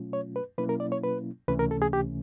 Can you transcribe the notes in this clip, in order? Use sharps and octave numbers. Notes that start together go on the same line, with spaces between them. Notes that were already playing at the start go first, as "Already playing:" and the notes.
Already playing: B2 F#3 A3 C#4 F4
C#5
B4
B2 F#3 A#3 C#4 E4 B4
A#4
D5
C#5
B4
C#2 C3 E3 A3 C#4 B4
A#4
A4
G#4
G4